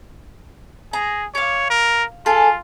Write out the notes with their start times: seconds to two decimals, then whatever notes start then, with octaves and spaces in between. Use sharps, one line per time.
0.93 G#4 A#5
1.35 C#5 F5 D6
1.70 A#4
2.26 F4 G#4 A4